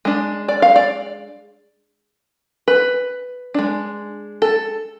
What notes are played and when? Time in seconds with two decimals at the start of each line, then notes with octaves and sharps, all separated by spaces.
0.05 G#3 D4
0.48 D5
0.62 F5
0.76 D5
2.68 B4
3.54 G#3 D4
4.42 A4